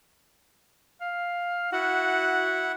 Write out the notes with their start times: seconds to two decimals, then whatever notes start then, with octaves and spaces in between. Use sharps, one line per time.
1.01 F5
1.72 E4 F#4 F#5